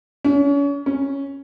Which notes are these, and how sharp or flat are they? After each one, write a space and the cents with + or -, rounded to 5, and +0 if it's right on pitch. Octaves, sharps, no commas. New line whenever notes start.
C#4 +35
C#4 +0